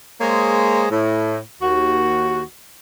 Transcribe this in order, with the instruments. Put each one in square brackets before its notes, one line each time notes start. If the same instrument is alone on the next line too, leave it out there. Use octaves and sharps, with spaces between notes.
[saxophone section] G#3 A#3 G#4 C5 C#5
A2
D#2 F#4